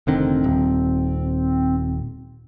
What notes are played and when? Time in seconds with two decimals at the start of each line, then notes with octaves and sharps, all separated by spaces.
0.07 F1 D3 D#3 C4
0.44 D#1